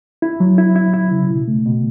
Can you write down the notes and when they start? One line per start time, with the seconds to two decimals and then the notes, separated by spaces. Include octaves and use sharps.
0.22 E4
0.40 F#3
0.58 E4
0.76 E4
0.93 E4
1.12 C#3
1.29 B2
1.48 A3
1.66 B2